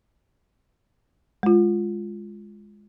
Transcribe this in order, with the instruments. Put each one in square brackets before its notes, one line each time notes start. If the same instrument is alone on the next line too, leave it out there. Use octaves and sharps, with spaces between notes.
[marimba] G#3 F4